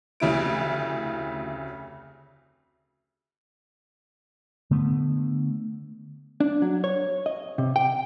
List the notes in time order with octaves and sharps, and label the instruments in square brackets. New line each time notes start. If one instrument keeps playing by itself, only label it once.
[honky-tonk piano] F1 D2 C#3 E4 D7
[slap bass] D3 A3 B3
[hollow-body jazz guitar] D4
F#3
C#5
D#5
C3
G5